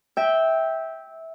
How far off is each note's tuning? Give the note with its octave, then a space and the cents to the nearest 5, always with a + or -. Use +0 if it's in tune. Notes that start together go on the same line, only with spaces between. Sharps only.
E5 -15 G5 +0